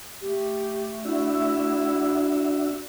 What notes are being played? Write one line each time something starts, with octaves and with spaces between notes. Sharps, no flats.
A3 G4
D4 E4 F#4 E5